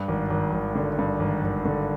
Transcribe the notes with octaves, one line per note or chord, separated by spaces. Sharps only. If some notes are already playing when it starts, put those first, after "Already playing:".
Already playing: G2
G#1
G#1
G#1
D3
G2
G#1
G#1
D3